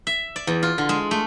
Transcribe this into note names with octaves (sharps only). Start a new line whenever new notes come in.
E5
D5
E2
F4
D3
G#3
A3